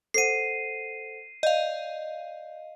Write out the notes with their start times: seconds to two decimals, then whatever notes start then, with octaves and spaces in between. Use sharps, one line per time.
0.14 A4 C5 F#5 C7 D#7
1.43 D5 D#5 F5 G6